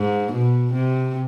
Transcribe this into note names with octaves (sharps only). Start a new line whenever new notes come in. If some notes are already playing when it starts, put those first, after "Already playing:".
Already playing: G#2
B2
C3